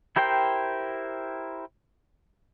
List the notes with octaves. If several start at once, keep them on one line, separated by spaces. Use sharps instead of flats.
E4 G4 A#4 C5 G5